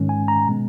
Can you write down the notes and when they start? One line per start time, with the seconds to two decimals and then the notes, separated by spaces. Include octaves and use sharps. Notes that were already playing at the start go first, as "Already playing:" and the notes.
Already playing: G#2 D#3 G#3 C#4
0.09 G#5
0.28 A#5
0.47 B2 G#3 B3